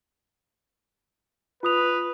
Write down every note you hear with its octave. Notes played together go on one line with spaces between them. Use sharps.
F4 B4 D#6 F7